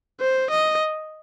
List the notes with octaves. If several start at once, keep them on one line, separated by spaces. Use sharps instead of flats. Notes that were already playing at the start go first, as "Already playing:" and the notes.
C5
D#5